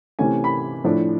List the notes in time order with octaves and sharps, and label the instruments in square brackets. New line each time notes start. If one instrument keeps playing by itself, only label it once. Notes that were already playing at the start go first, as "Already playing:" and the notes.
[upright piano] C3 E3 A3 C#4 G#5
B5
A2 F3 A3 D4